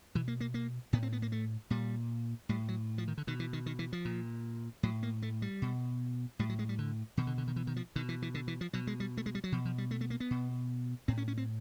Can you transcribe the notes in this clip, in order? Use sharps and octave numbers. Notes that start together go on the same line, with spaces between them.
B2 E3
A#3
A#3
A#3
A2 B3
C4
B3
A#3
A3
A#2 G3
A2 G3
F#3
F3
D#3
D3
B2 D#3
E3
D#3
D#3
E3
F3
A#2
A2 F#3
A#3
A3
G3
B2
A2 G3
F#3
G#3
G3
D3
B2 D#3
D3
D3
D#3
E3
D#3
F3
B2 D#3
E3
E3
D3
E3
F3
B2 F#3
G#3
G3
A3
G#3
G3
F#3
B2 F3
F3
G3
A3
A3
A#3
B3
B2
A2 C4
C#4
C#4
C4